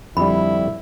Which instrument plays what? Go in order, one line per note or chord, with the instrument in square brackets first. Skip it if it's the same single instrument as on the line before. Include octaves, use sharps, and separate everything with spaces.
[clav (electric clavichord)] F2 D3 G3 [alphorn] E4 [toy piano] B5